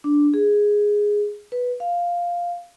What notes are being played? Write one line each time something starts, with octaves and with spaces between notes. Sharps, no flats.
D4
G#4
B4
F5